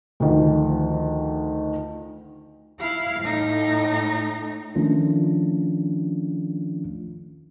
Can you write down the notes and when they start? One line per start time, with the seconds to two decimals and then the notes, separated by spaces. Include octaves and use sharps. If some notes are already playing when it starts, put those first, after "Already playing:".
0.20 D2 D#3 F3
2.80 E4 F5
3.21 A2 D#4
4.75 D#3 F3 A3 C#4 D4 F4